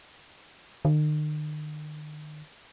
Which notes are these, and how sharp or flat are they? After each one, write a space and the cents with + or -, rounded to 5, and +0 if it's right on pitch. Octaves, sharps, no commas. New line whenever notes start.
D#3 -45